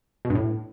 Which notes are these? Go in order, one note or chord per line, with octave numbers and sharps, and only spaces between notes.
B2
G2
A2